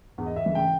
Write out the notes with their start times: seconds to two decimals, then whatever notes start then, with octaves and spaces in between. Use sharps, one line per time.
0.18 E2
0.26 D#5
0.36 E5
0.46 C#3 E3
0.55 G5